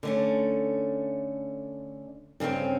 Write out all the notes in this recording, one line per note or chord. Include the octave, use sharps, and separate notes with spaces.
D3 A3 C#4
G2 C#3 A#3 C4 C#4